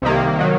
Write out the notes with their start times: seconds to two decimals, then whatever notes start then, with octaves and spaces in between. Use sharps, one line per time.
0.02 C2 C3 D#3 A#3
0.39 D#3 F#3